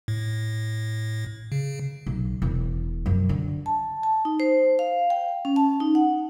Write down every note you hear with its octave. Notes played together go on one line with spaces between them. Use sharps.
A2
C#3
B1
E1
F#2 F3
D3
A5
A5
D#4
C5
F5
G5
C#4
A5
D#4
F#5